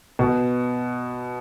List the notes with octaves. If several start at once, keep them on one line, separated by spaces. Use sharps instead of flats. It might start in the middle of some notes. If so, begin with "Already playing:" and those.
B2